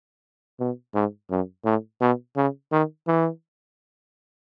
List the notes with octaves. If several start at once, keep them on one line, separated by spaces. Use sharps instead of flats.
B2
G#2
F#2
A2
B2
C#3
D#3
E3